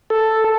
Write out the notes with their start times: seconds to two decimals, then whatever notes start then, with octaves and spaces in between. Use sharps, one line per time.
0.10 A4